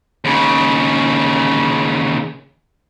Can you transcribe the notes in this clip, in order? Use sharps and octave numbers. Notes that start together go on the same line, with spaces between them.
D#2 C#3